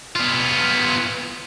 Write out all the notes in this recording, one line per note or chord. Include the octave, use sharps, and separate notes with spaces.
B3 F4